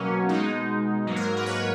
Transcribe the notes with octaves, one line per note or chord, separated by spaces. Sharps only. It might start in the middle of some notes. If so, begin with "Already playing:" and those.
Already playing: B2 F#3 A#3 C#4
B2 G#3 D#4
G#2 F#3 A#3 D#4
A#4
B4
C#5